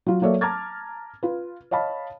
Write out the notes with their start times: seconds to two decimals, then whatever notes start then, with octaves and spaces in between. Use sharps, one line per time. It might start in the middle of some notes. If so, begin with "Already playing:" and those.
0.06 F#3 F4
0.22 F#3 A#3 A4 C#5 D5 E5
0.41 A5 A#5 D6 F6 G#6 A6
1.23 F4 B4
1.71 C#5 D#5 F5 A5 B5